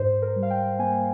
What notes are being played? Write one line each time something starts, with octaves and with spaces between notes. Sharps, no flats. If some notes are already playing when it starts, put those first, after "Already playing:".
Already playing: G#2 C5
A#4
G3
F5
G5
A#3 G#5